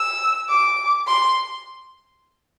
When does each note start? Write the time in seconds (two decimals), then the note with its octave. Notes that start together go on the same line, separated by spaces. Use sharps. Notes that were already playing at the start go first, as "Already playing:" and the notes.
Already playing: E6
0.49 D6
1.07 C6